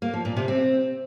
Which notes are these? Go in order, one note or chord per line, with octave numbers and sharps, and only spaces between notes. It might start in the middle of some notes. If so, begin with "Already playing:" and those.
A#3
F3
A#2
C3
C4